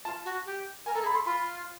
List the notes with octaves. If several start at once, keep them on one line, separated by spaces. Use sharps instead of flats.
F4 A5
F#4
G4
A#4 G#5
A4 A#5
G#4
B5
A4
C6
F4 B5